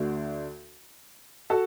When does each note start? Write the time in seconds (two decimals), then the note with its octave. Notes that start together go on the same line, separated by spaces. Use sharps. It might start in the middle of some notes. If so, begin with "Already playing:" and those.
Already playing: D2 D3 D4 F#4
1.50 F#4 A4